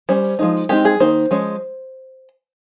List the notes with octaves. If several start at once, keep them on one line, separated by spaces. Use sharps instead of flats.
G3 C#4 C5
F3 G#3 D#4
G#3 C4 D#4 G4
G#4
D#3 A#3 D#4 C5
F3 G#3 C#4